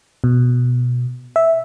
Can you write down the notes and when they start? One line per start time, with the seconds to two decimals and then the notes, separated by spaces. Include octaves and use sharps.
0.24 B2
1.36 E5